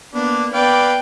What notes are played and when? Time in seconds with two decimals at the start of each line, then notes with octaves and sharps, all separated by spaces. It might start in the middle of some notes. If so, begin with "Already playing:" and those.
0.13 A#3 B3 D4
0.54 B3 B4 D5 F5 G5